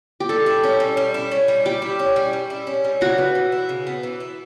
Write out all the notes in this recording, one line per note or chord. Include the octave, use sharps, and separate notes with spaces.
G4
G3 A4
E4
C#4
G3
G3
E4
C#4
G3
G3 G4
E4
C#4
G3
G3
E4
C#4
G3
C#3 F#4
B3
E3
E4
C#3
B3
E3
E4